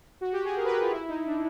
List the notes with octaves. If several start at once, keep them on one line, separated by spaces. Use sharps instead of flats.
F#4
G4
G#4
A#4
B4
A#4
F4
E4
D#4
D4